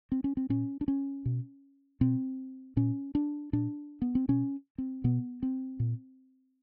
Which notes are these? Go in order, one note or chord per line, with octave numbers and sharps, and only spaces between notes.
C4
C#4
C4
A#2 C#4
D4
C#4
B2
B2 C4
A#2 C#4
D4
A#2 D4
B3
C4
B2 C#4
C4
B2 B3
C4
A#2